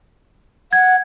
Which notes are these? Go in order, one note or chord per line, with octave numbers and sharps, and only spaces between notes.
F#5 G#6